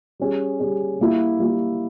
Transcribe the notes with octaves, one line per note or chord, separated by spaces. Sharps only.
G3 C#4 G#4
G3 C#4 G#4
G3 A#3 E4
G3 A#3 E4